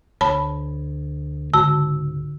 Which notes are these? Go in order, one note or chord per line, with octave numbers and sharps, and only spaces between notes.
D2 C#5 A5 B5
C#2 G#2 D3 F#4 A5 E6